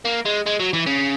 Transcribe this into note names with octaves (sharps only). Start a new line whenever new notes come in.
A#3
G#3
G#3
F#3
E3
C#3